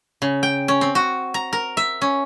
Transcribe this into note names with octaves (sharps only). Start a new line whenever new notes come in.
C#3
G5
C#4
C4
F#4
A#5
A#4
E5
C#4